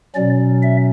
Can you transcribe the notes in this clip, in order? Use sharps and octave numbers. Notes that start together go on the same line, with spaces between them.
B2 F#3 C#4 D5
E5